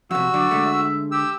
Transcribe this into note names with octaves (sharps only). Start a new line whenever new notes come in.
F2 C3 F#4 E6
D3 F#3 D5
D3 G#3 A3
E5
G4 E6